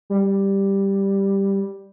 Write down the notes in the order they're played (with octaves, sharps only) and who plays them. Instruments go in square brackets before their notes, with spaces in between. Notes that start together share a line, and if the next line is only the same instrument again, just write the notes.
[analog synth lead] G3